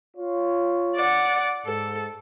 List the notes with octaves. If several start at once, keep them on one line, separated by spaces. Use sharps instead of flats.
F4 C#5
D5 F#5
G#2 A4